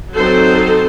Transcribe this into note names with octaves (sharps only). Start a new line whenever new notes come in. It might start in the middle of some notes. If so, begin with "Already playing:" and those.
F#3 C4 D#4 A4 C5